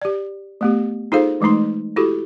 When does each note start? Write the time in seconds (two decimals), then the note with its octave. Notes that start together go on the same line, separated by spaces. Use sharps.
0.02 G4 D5
0.61 A3 B3 G4
1.12 D#4 F4 G#4 A4 C5 F5
1.41 E3 G#3 A3 D#4 C6
1.96 E4 F#4 G4 A4